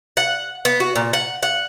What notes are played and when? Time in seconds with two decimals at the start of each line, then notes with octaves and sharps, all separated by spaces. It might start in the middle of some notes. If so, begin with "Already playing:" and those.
0.17 F#5
0.65 B3
0.80 F#4
0.96 A#2
1.13 F#5
1.43 F#5